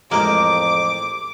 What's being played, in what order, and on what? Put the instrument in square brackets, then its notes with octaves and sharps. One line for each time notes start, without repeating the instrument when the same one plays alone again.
[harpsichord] A1 G#3 C5 [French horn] F2 [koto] A#3 [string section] D6